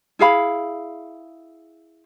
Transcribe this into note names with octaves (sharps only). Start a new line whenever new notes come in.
E4 G#4 F5 B5